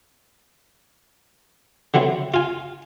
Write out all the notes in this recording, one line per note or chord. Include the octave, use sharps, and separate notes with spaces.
D3 E3 F#3 C4
F4 G#5